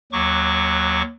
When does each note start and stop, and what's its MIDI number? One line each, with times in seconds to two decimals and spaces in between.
0.12 1.02 39
0.12 1.02 54
0.12 1.02 85
0.12 1.02 86